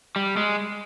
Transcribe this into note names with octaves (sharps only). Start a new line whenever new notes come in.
G3
G#3